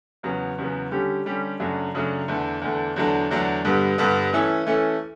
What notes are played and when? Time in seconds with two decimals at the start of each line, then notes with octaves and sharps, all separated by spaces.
0.23 E2 C#3 F#3 B3
0.58 E2 C#3 F#3 B3
0.91 D3 G3 C#4 G4
1.26 D3 G3 C#4 G4
1.60 F#2 C#3 F#3 A3 D4
1.94 F#2 C#3 F#3 A3 D4
2.28 E2 D3 A3 D4
2.62 E2 D3 A3 D4
2.96 E2 D3 F#3 A3 D4
3.30 E2 D3 F#3 A3 D4
3.65 G2 D3 G3 B3
3.98 G2 D3 G3 B3
4.33 E3 A3 C#4 E4 A4
4.66 E3 A3 C#4 E4 A4